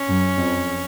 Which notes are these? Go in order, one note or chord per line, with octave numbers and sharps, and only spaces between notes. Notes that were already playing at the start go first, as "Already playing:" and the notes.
Already playing: C#4
F#2
F2